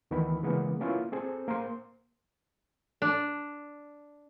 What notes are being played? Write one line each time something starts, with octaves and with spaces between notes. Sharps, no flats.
D2 D#3 E3 B3 B5
C#3 E3 G#3 A#3 B3
A#3 B3 C#4 E4 F4
C4 G#4 A4 C5
A#3 A#4 C5 C6
D4